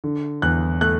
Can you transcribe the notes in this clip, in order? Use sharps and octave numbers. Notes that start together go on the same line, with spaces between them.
D3
E2 F#6
A3 F#6